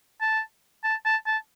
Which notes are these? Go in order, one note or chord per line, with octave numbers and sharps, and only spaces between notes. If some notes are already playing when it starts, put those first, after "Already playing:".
A5
A5
A5
A5